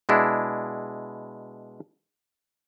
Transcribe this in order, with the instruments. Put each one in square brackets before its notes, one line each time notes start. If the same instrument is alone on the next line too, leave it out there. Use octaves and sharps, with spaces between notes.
[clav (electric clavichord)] B2 G#3 D4 E4